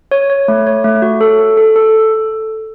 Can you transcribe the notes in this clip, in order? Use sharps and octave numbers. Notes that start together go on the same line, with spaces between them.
C#5
C#5
A3
C#5
A3
F#4
A4
A4
A4
A4